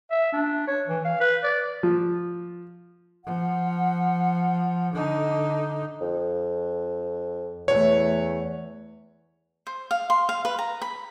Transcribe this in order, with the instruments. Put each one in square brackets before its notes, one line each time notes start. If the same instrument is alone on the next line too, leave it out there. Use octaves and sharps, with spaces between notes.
[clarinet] E5
D4
C#5
E3
F5
B4
D5
[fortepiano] F3
[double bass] F3 [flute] F#5
[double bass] D3 D#4
[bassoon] F2
[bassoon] E2 [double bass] E3 A3 [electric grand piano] C#5
[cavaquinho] C5
F5
C6
F5
B4
A#5
B5